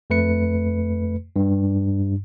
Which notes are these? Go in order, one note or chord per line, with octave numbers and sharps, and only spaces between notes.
F2 A3 B4 C#7
G2